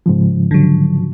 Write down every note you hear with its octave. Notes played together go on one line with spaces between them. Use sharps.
G#2 C#3 F3
D3 F#3